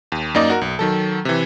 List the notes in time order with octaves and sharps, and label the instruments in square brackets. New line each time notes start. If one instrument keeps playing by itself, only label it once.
[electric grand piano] D#2
F#2 A#3 D#4 D5 D#5
F#4 A#4
B1
D#3 F#3 A4
C3 E3